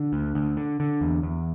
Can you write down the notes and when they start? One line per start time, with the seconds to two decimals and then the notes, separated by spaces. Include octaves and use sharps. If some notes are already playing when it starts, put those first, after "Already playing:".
Already playing: D3
0.13 D2
0.35 D2
0.57 D3
0.80 D3
1.01 E2
1.23 E2